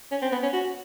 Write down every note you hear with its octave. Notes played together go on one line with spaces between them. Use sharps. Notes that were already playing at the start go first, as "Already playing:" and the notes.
C#4
C4
B3
C#4
F#4